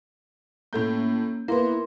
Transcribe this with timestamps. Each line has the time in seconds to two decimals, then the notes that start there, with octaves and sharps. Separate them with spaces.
0.73 A2 A3 A#3 C#4 G6
1.48 A#3 B3 E4 A#4 C6